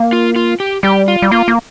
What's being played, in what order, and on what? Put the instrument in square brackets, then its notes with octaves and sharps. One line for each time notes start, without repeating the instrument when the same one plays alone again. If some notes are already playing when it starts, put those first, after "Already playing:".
Already playing: [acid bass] A#3
[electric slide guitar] F4
F4
G4
[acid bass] G3 [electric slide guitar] G4
[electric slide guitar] F4
[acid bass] G3
[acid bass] A#3 [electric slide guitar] F4
[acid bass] A#3